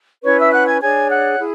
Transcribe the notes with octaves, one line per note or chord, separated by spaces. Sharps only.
C#4 E4 B4 C#5 C#6
E5 E6
F#5 F#6
G#5 G#6
D4 G#4 C#5 G#5 G#6
F#5 F#6
E4 G#4